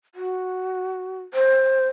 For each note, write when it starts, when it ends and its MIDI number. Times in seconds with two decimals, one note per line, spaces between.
0.15 1.20 66
1.34 1.88 72